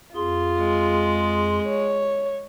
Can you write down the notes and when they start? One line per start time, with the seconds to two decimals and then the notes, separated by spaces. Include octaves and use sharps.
0.15 F2 F4 G#4 C6
0.59 G#3
1.66 C#5